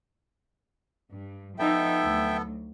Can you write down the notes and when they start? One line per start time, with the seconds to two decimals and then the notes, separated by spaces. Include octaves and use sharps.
1.10 G2
1.59 F3 B3 D#4 A4 E5 G5
2.05 D2 F#3